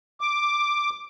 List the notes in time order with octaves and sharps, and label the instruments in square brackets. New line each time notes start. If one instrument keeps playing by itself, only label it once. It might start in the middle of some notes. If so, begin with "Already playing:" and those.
[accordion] D6